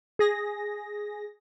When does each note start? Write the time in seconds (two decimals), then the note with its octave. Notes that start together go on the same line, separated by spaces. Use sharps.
0.19 G#4 A#6